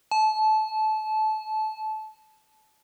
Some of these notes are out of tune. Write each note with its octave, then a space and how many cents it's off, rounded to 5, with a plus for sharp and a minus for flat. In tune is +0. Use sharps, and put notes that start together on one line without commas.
A5 -25